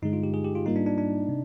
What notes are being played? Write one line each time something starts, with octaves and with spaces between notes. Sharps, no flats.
G2 D3 G#3 D#4
F4
G4
G#4
G4
F4
G#2 G3 A#3 D#4 F4
D4
D4
D4
C3